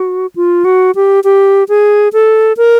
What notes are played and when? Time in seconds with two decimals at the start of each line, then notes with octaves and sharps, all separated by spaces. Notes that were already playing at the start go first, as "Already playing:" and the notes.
Already playing: F#4
0.36 F4
0.65 F#4
0.95 G4
1.24 G4
1.69 G#4
2.13 A4
2.57 A#4